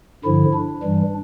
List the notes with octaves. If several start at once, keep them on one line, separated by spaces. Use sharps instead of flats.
G2 D3 F3 E4
D4
G2 E3 G3